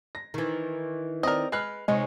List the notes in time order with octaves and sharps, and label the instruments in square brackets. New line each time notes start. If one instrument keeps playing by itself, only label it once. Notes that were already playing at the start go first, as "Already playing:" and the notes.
[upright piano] A#6
[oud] D#3 E3
[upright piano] C4 D5 [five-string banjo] A#4 D#5
[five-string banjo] G#3 B4 [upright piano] F6 F#6 C7
[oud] C3 D#4 C#5 [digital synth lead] G#3